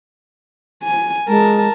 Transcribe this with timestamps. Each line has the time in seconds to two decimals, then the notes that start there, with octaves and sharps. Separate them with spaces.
0.84 G#5
1.28 G#3 A#4 A5